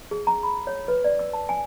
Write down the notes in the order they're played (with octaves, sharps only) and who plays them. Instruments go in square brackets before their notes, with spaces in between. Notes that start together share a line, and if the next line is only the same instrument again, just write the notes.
[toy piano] G#4
A#5
B5
C#5
B4
D5
E6
A5
G#5